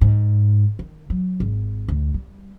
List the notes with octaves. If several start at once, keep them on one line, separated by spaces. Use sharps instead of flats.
G#2
D#3
F#3
G#1
D2
G3